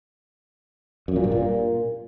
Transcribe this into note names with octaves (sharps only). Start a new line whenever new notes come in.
F#2
A#2
G2
A#2